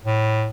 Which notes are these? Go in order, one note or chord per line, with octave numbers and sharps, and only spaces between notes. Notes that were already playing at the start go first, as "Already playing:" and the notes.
A2